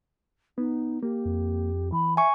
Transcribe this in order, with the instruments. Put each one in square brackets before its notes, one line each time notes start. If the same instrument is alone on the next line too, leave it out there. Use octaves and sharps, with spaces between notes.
[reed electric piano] B3 [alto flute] D#4
[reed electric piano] A#3 [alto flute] G4
[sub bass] F2
[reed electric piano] E3 [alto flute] B5
[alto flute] E5 [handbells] G#5 C#6